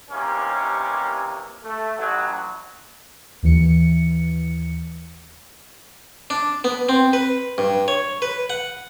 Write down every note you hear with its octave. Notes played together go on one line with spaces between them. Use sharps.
D#2 C3 E3 A#3 C#4
A3
A1 F#3
D#2 E3 C#7
D4
B3
C4
B4
G2
C#5
B4
F#5